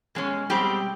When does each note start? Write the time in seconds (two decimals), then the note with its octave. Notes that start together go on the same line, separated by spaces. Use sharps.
0.15 B2 G#3 C#4
0.50 B2 G3 G#3 C4 G4